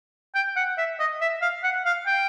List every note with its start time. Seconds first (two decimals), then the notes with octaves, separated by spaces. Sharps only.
0.35 G5
0.56 F#5
0.78 E5
1.00 D#5
1.21 E5
1.42 F5
1.63 F#5
1.86 F5
2.07 G5